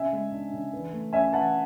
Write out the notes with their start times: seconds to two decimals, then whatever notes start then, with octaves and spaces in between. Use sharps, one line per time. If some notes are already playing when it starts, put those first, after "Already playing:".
Already playing: C#3 E5 G#5
0.12 G#3
0.32 D4
0.53 C#3
0.73 E3
0.92 A3
1.13 C#4 E5 G#5
1.33 E3 F#5 A5